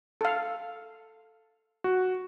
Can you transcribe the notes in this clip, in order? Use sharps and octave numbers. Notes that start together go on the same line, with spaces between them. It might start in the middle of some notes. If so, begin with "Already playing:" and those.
A4 F5
F#4